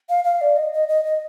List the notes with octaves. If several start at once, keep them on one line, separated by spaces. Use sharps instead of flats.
F5
F5
D5
D#5
D#5
D#5
D#5